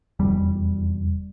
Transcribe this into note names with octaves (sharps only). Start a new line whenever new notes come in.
F1 E2 G3